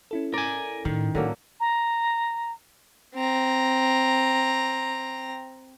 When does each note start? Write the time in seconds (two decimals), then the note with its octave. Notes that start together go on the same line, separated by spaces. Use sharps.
0.11 C#4 E4 A4
0.34 A#4 D5 G#5
0.85 A2 D#3
1.15 A2 D3 F#3 A#3
1.60 A#5
3.15 C4 A#5